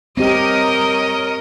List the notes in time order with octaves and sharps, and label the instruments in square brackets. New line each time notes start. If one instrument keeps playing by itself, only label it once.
[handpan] C4 G4 [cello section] A#4 C#5 D#5